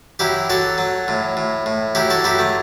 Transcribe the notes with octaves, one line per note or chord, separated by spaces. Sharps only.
F#3 E4 G4
F#3 F#4 A4
F#3
A2
A2
A2
F#3 E4 G4
F#4 A4
F#3 E4 G4
A3